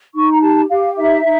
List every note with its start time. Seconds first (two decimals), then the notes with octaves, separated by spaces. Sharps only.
0.14 D#4 C#6
0.30 A#5
0.41 G4 A5
0.69 G4 F5
0.96 D#4 E5
1.24 D#4